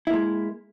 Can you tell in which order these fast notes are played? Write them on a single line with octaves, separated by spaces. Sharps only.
E4 A#3 G#3